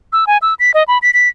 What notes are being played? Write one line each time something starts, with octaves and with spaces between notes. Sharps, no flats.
E6
G#5
E6
B6
D#5
B5
B6
B6